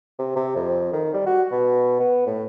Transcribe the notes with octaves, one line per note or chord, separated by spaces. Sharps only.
C3
C3
F2
D#3
G3
F#4
B2
B3
A2